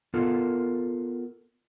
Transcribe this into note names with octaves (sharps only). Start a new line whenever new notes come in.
B3 F4 A4 A#4